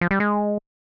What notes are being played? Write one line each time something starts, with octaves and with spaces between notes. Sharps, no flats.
F3
G3
G#3